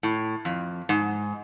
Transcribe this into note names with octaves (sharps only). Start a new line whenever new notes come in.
A2
F2
G#2